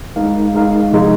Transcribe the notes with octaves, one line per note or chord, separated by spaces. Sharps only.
G#3 D#4 A#4 F5
G#3 D#4 A#4 F5
C3 F3 G#3 D#4